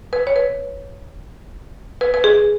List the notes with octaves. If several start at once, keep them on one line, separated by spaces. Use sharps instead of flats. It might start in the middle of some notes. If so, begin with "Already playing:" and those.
B4
C#5
B4
B4
B4
G#4